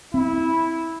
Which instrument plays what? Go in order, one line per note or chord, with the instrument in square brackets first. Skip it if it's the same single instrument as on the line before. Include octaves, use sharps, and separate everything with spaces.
[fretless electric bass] C4 [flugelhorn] E4